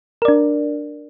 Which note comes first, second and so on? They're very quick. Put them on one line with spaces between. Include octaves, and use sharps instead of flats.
A#4 D5 D4